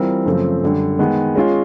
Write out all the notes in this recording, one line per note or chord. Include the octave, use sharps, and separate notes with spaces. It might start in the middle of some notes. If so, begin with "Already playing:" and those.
Already playing: E3 G3 C4 F4 A#4
F#2 C#3 F3 A3 C4
F#2 D3 G3
D#3 G#3 B3
G#3 C#4 F4